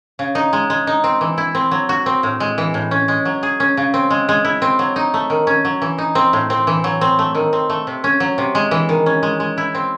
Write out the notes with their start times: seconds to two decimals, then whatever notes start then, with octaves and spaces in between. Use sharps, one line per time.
0.19 C#3
0.35 D#4
0.53 G#3
0.70 G#3
0.87 D#4
1.04 C4
1.21 E3
1.38 E4
1.55 C4
1.71 F#3
1.89 F#4
2.06 C4
2.23 A2
2.40 G#3
2.58 E3
2.74 A2
2.91 C#4
3.08 G#3
3.25 F#3
3.43 G#4
3.60 C#4
3.77 C#3
3.94 C4
4.10 G#3
4.29 G#3
4.44 E4
4.62 C4
4.79 F#3
4.96 D#4
5.14 A3
5.30 D#3
5.47 C#4
5.65 F#3
5.82 E3
5.98 D#4
6.15 C4
6.33 A2
6.50 C4
6.67 E3
6.84 F#3
7.01 C4
7.19 A3
7.35 D#3
7.53 C4
7.70 A3
7.87 C3
8.04 C#4
8.20 F#3
8.38 C3
8.55 G#3
8.71 E3
8.89 D#3
9.06 C#4
9.23 G#3
9.40 G#3
9.58 E4
9.75 C4